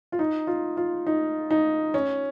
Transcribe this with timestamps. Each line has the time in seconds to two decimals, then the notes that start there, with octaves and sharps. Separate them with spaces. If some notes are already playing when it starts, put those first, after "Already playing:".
0.12 F4
0.19 D#4
0.47 F4
0.77 F4
1.07 D#4
1.51 D#4
1.94 C#4